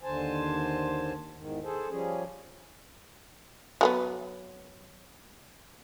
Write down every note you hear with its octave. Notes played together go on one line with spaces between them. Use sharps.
D#2 D3 C5 G#5 A5
E2 G#2 D#3
G#4 A4 C5
F3 G3 C#4 G#4
F#3 A#3 B3